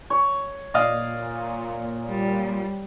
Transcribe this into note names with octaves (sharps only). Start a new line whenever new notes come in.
C#5
A#2 D5 D#5 F5
G3